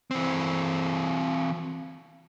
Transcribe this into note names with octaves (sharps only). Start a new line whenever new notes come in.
E3 C4